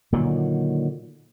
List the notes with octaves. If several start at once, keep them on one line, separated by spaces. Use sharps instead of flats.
A#2 D3 D#3 F#3